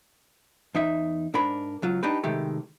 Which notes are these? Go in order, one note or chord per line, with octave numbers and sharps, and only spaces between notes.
E2 D#4 E5
G#2 D4 A#4 B5
C#2 F#3 F4
D4 D#4 G4 B4
A2 C3 D#3 G#3 A3 G4